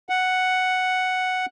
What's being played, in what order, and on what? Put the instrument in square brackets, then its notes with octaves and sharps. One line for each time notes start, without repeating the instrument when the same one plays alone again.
[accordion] F#5